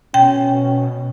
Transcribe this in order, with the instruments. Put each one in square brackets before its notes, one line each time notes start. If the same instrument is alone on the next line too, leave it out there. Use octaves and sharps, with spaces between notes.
[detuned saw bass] B2 [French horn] C#4 [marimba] G5